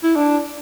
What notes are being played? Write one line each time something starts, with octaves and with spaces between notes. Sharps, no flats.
E4
D4